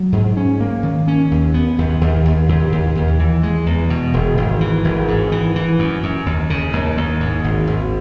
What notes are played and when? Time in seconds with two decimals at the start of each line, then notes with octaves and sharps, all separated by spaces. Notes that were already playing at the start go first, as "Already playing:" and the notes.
Already playing: F#3
0.12 G#2
0.37 C#4
0.61 A#3
0.83 D#3
1.08 C#4
1.31 D#2
1.54 B3
1.78 D#2
2.01 D#2
2.25 D#2
2.49 D#2
2.72 D#2
2.96 D#2
3.19 E3
3.43 G#3
3.66 E2
3.90 B2
4.14 E1
4.37 G#1
4.61 E3
4.84 G#1
5.08 G#2
5.32 E3
5.56 E3
5.79 F#2
6.03 F#2
6.26 D#2
6.50 C#3
6.73 D#2
6.97 D#2
7.20 G#2
7.44 G#1
7.67 G#1